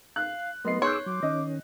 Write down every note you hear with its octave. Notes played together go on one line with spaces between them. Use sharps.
F5 F#6
F#3 A3 B3 A#4 D#5 C6 C7
G#4 C#5 C6 D6 E6 F#6 G6
F#3 D6
D#3 C#4 D#5